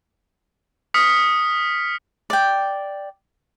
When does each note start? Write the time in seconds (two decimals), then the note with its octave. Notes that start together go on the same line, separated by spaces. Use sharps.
0.94 D#6 F6 B6 C#7
2.30 D5 G5